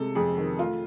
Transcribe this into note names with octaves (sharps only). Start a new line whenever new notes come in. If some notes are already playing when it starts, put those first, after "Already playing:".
Already playing: C3 G#3 A4
F2 G#4
D#3
A3 F4